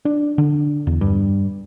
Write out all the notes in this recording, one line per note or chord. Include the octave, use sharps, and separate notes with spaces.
D4
D3
E2
G2